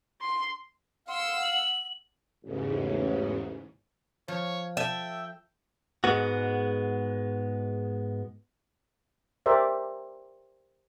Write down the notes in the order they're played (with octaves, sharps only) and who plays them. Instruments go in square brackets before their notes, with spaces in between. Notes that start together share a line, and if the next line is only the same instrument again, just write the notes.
[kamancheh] C6
[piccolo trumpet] F5 [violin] F#5 E6 [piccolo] C6
[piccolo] F#7
[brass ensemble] A1 [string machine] E2 G#2 C#3
[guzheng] F3 [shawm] C#5
[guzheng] A4 [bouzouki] E5 [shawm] G5
[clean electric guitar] G#2 G#3 B3 F#4
[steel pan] G4 A#4 C5 D5 E5